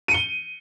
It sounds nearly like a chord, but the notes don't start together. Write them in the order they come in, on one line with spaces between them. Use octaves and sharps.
D#7 C#7 G7